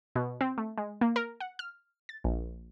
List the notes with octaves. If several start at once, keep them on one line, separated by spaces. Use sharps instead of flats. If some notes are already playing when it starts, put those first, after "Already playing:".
B2
C4
A3
G#3
A#3
A#4
F#5
F6
A6
A#1